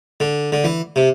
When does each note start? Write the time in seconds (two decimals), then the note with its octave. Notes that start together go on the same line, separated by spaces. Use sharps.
0.20 D3
0.52 D3
0.64 E3
0.96 C3